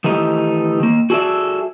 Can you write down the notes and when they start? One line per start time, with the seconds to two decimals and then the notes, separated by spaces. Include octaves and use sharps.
0.04 D#3 E3 A3 D#4 G4
0.80 D#3 A#3
1.10 F#4 G#4 A4 B4 D5 E5